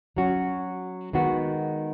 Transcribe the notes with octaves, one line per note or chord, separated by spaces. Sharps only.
F#3 C#4 F#4
D#3 G#3 B3 F#4